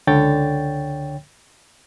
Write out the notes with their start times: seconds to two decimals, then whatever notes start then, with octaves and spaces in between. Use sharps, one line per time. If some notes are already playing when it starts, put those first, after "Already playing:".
0.07 C#2 D3 C#5 G5 A6